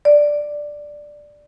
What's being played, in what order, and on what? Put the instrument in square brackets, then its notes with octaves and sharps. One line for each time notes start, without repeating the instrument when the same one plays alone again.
[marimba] D5